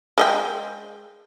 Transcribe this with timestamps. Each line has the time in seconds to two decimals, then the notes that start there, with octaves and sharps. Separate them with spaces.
0.18 G#3 D#5 G5